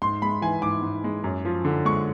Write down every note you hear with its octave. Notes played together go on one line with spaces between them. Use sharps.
G#2 C6
G#3 B5
E3 G#5
G#2 D6
G#2
G#3
F#2
F3
D3
G#3 C#6